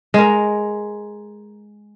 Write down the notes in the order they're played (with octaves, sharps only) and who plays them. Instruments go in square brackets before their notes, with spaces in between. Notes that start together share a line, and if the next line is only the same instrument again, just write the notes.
[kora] G#3 A#4